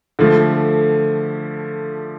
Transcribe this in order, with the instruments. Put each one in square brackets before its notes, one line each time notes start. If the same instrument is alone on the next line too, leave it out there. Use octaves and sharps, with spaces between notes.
[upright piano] D3 F3 A3